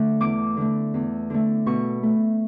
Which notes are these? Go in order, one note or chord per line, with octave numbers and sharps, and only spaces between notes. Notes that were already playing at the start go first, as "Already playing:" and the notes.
Already playing: D3 A3
E2 D6
D3 A3
E2
D3 A3
B2 C#6
A3